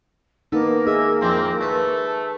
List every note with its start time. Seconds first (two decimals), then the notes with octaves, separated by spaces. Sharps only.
0.52 A#3 B3 D#4 A4
0.87 G#4 D#5 E5
1.21 F2 C4 E4 A#5
1.61 A3 B4 C5
2.05 A5